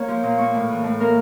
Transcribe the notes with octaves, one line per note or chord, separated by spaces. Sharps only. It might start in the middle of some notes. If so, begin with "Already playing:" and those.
Already playing: A#3 C#5
F3
A#2
A#3 C#5
A2
E3
A2
A#3 A#4